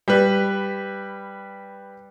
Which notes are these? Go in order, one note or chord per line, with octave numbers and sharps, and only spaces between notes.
G3 B4